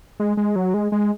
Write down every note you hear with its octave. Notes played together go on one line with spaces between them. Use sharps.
G#3
G#3
F#3
G#3
G#3